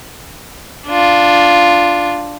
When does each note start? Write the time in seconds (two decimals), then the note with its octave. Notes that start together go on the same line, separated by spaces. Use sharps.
0.87 D4 F4